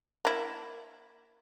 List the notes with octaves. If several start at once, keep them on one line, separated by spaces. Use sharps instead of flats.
A#3 E4